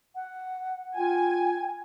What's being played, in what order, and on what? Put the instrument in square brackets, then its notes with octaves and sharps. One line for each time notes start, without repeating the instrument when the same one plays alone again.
[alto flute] F#5
[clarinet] F4 [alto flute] G5 [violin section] G#5